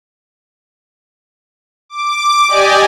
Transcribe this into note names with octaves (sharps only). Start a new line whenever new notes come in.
D6
G4 D5 D#5 G#5